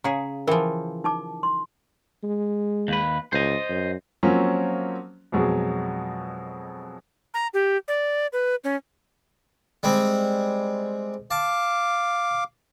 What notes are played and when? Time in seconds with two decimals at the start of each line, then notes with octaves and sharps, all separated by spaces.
0.04 C#3 G#4 F5 G#5 A#5
0.48 E3 F3 A#4 G5 G#5
1.04 D#4 A5 D6
1.43 C6
2.23 G#3
2.88 D#2 B4
3.33 C#2 C5 D#5
3.69 F#2
4.23 F3 F#3 A#3 C4 C#4
5.32 F2 B2 F#3 G#3
7.34 A#5
7.54 G4
7.88 D5
8.33 B4
8.64 C#4
9.83 G3 G#3 C4
11.31 F5 A5 D6